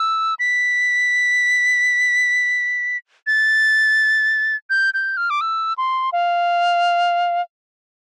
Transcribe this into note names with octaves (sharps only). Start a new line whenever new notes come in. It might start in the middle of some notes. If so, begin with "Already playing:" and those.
Already playing: E6
B6
A6
G6
G6
F6
D6
E6
C6
F5